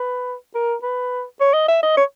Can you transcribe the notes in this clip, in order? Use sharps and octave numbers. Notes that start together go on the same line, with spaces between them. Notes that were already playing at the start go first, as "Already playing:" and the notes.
Already playing: B4
A#4
B4
C#5
D#5
E5
D#5
C#5